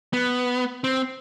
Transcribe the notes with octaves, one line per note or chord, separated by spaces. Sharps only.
B3
C4